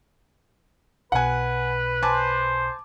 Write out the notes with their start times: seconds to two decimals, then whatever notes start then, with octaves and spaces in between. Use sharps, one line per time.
1.12 B1 B2 B4 F#5 G#5
2.03 C5 G#5 A5 D6